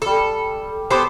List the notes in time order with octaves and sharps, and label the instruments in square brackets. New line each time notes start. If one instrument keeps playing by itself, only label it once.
[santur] G3 E6 [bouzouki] A4
[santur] B3 C6 D6 [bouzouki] G4 A4 C5